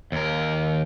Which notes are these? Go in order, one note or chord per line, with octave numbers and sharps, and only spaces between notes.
D#2 A#4